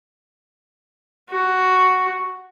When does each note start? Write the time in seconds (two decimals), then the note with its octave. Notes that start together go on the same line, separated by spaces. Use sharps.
1.30 F#4